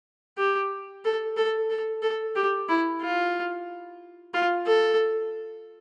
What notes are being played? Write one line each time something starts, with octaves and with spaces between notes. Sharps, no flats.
G4
A4
A4
A4
A4
G4
E4
F4
F4
A4